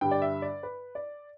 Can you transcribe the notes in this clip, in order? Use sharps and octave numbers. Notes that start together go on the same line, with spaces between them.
G2 D3 G3 G5
D5
E5
D5
B4
D5